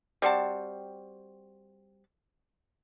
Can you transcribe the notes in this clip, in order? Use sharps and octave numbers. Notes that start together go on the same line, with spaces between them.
G3 C4 F#4 A5